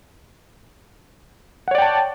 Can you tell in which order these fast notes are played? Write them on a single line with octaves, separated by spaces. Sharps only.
F#5 C#5 D5 G5 A5